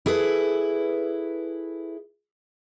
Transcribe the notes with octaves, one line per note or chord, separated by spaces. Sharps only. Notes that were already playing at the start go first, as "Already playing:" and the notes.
E4 G#4 A4 B4